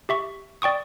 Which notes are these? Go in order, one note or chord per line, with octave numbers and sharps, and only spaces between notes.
G4 E5 C#6
D5 G5 C#6 D#6